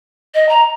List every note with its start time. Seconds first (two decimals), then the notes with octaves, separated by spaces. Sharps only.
0.35 D#5
0.49 A#5